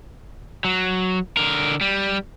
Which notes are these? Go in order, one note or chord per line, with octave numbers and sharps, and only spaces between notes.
F#3
D3 A#4
G3